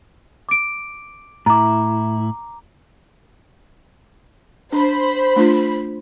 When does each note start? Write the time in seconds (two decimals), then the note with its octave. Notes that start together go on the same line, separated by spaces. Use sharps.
0.49 D6 D7
1.46 A2 E4 A#5 D6
4.73 D4 C5 B5
5.36 A3 D4 F4